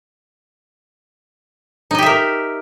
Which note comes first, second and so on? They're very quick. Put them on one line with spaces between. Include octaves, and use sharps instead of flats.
D#4 D#5 G4 E5 A#4